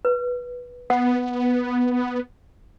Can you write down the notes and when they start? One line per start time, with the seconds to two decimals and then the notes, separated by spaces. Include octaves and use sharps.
0.05 B4
0.90 B3 F#5